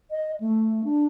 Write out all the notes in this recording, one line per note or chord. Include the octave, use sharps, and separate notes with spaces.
D#5
A3
D4